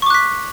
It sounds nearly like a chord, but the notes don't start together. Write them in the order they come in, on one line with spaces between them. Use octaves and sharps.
C#6 D6 F#6 B6